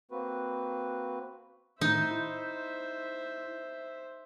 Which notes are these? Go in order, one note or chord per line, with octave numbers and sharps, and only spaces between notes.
A#3 C4 F#4 B4
A2 D#3 D#4 C5 E5
E4